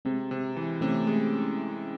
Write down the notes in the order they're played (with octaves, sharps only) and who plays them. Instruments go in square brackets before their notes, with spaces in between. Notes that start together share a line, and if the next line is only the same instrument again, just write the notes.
[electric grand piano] C3 [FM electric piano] G#3 C4
[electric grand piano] C3
E3
[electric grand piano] C3 [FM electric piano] A3 C#4
[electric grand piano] G#3